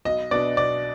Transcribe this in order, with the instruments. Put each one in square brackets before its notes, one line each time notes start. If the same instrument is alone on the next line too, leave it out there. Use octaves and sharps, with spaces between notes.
[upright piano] B1 [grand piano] D#5
[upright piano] B2 B3 D4 [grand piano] D5
[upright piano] B1 [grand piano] D5